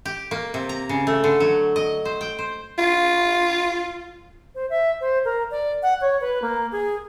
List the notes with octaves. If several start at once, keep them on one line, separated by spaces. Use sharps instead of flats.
G4
A#3
C3
A#5
C#3
A3
D3
F#3
D#5
C5
G5
C5
F4
C5
E5
C5
A#4
D5
F#5
C#5
B4
A#3
G#4